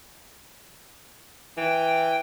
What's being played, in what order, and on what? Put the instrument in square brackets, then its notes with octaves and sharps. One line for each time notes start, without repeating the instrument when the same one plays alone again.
[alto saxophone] E3 [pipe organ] G5